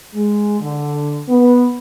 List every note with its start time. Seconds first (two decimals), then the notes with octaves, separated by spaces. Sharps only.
0.13 G#3
0.59 D3
1.27 B3